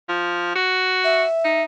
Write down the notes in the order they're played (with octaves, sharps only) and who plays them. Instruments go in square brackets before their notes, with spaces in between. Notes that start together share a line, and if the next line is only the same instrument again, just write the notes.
[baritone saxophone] F3
F#4
[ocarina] E5
[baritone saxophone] D#4